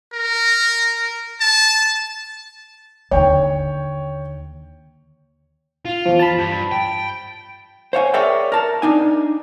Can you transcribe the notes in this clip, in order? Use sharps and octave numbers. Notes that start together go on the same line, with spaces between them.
A#4
A5
D#2 D3 C#5 G5
F4
E2 F3
A5 B5
G2
G5
C5 C#5 F5 G#5
G#4 A#4 C#5 D5 E5 G5
A#4 A5
D4 D#4 G#5